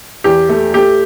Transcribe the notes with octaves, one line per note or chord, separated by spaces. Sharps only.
E2 G4
A3
A3 G4